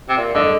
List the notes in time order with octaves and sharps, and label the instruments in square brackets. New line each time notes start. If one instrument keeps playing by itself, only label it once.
[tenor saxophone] C3
A#2
[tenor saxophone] D3 [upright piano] D#5